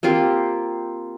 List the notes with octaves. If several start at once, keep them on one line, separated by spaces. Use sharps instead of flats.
A#3 C4 F4 G4